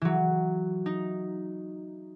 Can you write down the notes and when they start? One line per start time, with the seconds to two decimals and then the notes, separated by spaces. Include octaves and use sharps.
0.01 E3 F#3
0.86 D#4